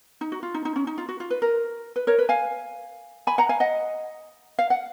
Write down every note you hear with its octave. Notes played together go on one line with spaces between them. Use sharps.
D#4
F#4
F4
D#4
D#4
C#4
D#4
F4
F#4
F4
B4
A#4
B4
A#4 C#5
B4
F5 G#5
G#5 B5
F#5 A#5
F5 G#5
D#5 F#5
F5
F#5